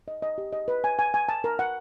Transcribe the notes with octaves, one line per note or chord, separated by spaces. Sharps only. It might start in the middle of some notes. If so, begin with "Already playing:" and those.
D#5
D#5
G4
D#5
B4
G#5
G#5
G#5
A5
A#4
F#5